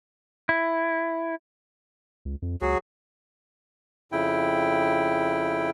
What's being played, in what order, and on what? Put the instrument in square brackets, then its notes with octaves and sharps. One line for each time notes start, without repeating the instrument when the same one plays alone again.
[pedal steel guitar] E4
[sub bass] C#2
F2
[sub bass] C#2 [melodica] F#3 F#4 G#4
[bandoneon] F2 C#3 E4 G5